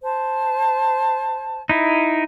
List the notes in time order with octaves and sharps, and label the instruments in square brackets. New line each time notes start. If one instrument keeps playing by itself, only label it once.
[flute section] C5 A5
[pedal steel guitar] D#4 E4